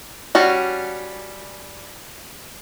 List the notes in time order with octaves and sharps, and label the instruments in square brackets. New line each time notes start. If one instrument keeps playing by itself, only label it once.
[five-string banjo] G3 C#4 F#4